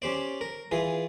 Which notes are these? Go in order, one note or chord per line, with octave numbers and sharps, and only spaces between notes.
C#4 G4 C5 D5
A#4
E3 F4 G#4